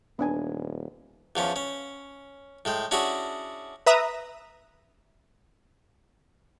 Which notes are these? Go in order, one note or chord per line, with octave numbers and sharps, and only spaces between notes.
D#1 B3 D4 G#5
E2 F3 C#4
C#4
A2 G#3 G5
C#4 D4 E4 F#4 G#4
B4 E5 A#5 D#6